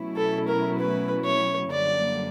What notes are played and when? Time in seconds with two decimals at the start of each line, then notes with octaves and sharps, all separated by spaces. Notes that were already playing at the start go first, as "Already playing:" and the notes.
Already playing: B2 F#3 A3 C#4 E4
0.17 A4
0.48 A#4
0.78 B4
1.25 C#5
1.71 F#2 D3 G3 A#3 D5